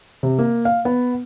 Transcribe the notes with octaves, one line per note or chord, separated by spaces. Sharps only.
C3
A#3
F5
B3